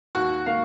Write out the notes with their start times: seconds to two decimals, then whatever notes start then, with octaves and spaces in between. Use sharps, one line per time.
0.15 D#2 F#4
0.46 A#3 F5